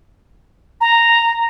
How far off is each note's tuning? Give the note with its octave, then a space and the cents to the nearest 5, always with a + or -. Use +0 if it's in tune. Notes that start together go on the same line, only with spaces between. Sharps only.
A#5 -5